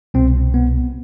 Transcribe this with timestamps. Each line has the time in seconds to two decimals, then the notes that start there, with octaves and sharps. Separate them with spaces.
0.14 C2 B2 C4
0.54 B3